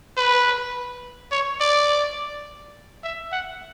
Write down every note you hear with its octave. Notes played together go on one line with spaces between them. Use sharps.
B4
C#5
D5
E5
F#5